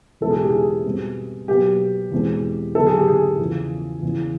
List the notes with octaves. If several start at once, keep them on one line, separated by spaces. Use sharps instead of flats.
E2 B2 G#3 C#4 A4
G#4
G4
G#4
B2 G3 C4
B2 F#3 A#3 G4
E2 B2 G#3 C4
D3 F#3 B3 A4
G#4
G4
G#4
E2 C#3 F3
E2 C#3 E3